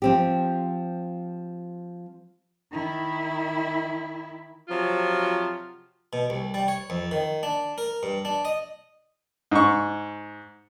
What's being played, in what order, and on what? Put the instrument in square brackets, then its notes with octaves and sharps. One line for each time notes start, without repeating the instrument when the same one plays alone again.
[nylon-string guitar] F3 C4 G4
[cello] D#3 E4
[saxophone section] C3 F3 F#3 F4
[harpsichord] B2
C2
G3
C#5
F2
D#3
D4
A#4
G2
D4
D#5
[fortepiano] G#2 C#6